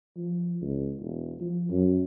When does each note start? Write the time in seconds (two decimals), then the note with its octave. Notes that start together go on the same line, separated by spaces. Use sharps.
0.17 F3
0.62 C#2
0.99 E1
1.40 F3
1.70 F#2